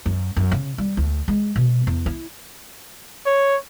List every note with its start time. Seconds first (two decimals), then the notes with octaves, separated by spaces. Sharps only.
0.06 F#2
0.36 F#2
0.51 C#3
0.78 G3
0.97 D2
1.28 G#3
1.56 B2
1.87 E2
2.06 E4
3.26 C#5